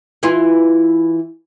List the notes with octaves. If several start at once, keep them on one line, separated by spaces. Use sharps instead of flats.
E3 E4 F4